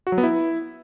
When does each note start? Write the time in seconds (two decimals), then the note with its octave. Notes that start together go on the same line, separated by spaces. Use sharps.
0.07 F#4
0.12 F#3
0.18 B3
0.23 E4